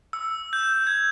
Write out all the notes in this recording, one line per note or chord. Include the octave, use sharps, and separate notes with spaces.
E6
G6
G#6